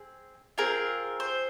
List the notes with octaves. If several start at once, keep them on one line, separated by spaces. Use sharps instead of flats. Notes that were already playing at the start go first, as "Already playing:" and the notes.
Already playing: C4 G#4
C4 F4 G#4 A#4
C5